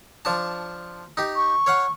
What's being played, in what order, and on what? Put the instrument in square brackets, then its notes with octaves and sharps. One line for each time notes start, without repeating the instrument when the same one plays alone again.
[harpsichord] F3 D4 A5
D#4 G4
[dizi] C#6
[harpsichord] C#5 F5 F#5